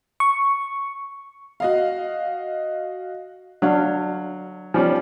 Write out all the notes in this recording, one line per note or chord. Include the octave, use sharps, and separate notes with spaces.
C#6
F#4 D#5 F5
F#3 D4 F5
F3 G3 C#4